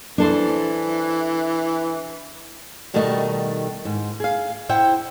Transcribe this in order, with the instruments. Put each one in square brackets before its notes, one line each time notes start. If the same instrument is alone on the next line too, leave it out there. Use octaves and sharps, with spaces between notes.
[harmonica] E3 [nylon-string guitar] D4 A4 C5
[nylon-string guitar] B2 D#3 G3 A3 F#4 D#5
G#2
G#4 F5
E4 C5 E5 F#5 G5